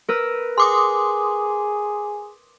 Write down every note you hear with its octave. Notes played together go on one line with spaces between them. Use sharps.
A#4 B4 E6
G#4 C6 D6 D#6